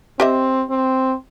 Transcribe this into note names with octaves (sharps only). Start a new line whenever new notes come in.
C4 G4 D#5 E5
C4